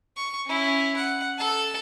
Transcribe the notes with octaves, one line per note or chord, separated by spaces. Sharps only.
C#6
C#4 E4
F#5
A4 A5